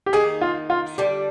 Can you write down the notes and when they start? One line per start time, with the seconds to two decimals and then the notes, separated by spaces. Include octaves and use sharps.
0.06 G4
0.13 D#3 A#3 D#4 G#4
0.41 F4
0.70 F4
0.98 D3 G3 D4 G4